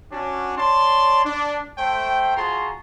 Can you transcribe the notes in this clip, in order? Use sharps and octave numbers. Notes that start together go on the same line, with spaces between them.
C#4 D4 F#4
C#5 D5 A5 C6
D4
A3 C5 G5
F4 F#4 G#4 A5 A#5 C6